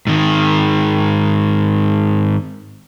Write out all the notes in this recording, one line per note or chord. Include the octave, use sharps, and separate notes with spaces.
G#2 D#3